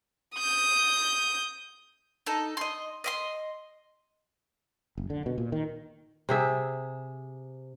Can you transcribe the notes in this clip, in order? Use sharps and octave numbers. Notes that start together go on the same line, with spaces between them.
D#6 G6
D#4 A4
D#5 C6
D#5 E5 C6
F#1
D3
B2
A#2
D#3
C3 G#4 E5